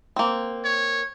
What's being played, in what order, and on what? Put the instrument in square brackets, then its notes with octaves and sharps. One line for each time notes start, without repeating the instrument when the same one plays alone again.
[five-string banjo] A#3 C4
[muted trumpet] C#5